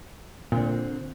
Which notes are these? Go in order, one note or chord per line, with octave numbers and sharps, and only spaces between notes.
A#2 D3 C4